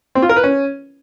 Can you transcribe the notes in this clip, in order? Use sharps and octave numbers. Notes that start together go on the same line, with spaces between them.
C4
F4
A#4
B4
C#4